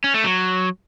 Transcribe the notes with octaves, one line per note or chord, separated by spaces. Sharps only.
C#4
A3
F#3